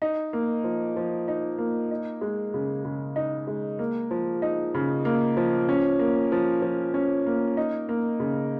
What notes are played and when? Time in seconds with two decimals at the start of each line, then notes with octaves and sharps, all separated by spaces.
0.02 D#4
0.33 A#3
0.64 F3
0.96 F3
1.28 D#4
1.58 A#3
1.91 D#4
2.21 G#3
2.54 C#3
2.85 C#3
3.16 D#4
3.47 G#3
3.79 A#3
4.11 F3
4.42 D#4
4.74 C#3
5.05 A#3
5.37 F3
5.69 C#4
5.99 A#3
6.32 F3
6.62 F3
6.94 C#4
7.26 A#3
7.57 D#4
7.89 A#3
8.20 C#3